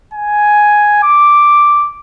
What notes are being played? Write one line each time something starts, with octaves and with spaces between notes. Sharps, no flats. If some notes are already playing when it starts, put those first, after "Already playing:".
G#5
D6